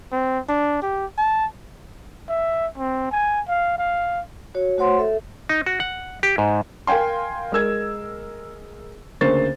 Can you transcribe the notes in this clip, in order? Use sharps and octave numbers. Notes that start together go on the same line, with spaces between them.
C4
D4
G4
A5
E5
C4
G#5
F5
F5
F#4 C#5
A3 F#4 C5 C#5 F#5 C6
A4 E5
D#4
F#4
F#5
G4
G#2
A#4 F5 G5 G#5 C6
G#3 A#4 E6 G#6
D2 C#3 A#3 C5 C#6 A6